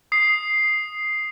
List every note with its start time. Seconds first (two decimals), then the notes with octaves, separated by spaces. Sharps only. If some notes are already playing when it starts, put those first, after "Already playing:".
0.12 D#6 C7